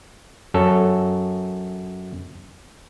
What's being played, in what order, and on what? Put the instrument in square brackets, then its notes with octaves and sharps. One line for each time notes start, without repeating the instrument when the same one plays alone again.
[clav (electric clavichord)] F#2 A4 C#5